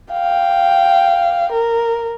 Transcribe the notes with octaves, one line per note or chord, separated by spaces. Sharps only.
F5 G5
A#4